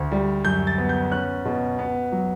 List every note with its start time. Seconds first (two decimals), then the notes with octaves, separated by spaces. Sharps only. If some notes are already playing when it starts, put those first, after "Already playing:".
Already playing: D2
0.12 G3
0.45 F#2 G6
0.67 A6
0.78 B3
0.89 G6
1.11 C#4 F#6
1.45 B2
1.79 B3
2.12 F#3